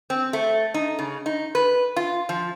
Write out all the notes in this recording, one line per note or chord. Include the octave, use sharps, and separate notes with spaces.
C4
A3
D#4
C#3
D#4
B4
F4
F3